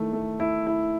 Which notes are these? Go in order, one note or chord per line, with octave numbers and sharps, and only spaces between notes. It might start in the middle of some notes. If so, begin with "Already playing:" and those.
Already playing: D#3 A3 E4
A3
E4
E4